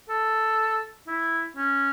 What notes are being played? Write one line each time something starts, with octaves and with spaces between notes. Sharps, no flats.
A4
E4
C#4